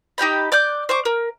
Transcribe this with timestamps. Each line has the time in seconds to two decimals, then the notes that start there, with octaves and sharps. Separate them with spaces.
0.18 D#4 G4 G5 B5
0.52 D5 D6 F#6 G6
0.89 C5 C#6 D6
1.05 A#4